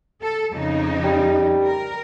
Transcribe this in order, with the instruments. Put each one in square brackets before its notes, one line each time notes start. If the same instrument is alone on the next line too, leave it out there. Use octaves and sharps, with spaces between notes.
[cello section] A4
F2 C#3 D#4
[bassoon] G3
[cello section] A#4